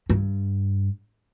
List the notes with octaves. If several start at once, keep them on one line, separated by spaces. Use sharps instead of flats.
G2